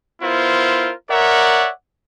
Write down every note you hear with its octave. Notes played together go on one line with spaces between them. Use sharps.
B3 E4 F4 A#4 C5
A#4 C#5 D5 E5 F#5